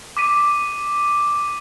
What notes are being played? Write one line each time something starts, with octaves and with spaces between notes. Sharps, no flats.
D6 B6 D#7